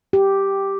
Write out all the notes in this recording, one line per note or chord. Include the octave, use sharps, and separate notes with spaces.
G4